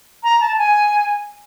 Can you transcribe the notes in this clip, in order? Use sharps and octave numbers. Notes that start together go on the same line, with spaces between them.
A#5
A5
G#5